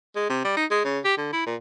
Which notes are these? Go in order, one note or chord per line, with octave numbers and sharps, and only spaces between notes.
G#3
C3
G3
D#4
G#3
C#3
G4
D3
E4
A#2